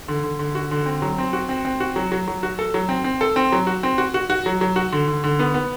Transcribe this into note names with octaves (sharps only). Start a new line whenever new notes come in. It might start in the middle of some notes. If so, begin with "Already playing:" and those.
D3
D3
D3
F#4
D3
C4
F#3
C4
F#4
C4
C4
F#4
F#3
F#3
F#3
F#4
A4
F#3
C4
C4
A4
C4
F#3
F#4
C4
F#4
F#4
F#4
F#3
F#3
F#4
D3
D3
D3
B3
B3